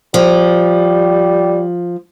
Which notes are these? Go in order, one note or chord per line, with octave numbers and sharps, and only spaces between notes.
F3 G3